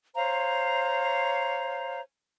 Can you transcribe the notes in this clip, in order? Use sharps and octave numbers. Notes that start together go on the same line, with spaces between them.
C5 C#5 F5 A#5